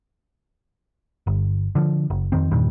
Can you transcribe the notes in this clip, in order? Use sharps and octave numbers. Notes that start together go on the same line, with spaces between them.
G1
D3 F3
F#1
F2 D#3 C4
E2 G2 A#2 D#3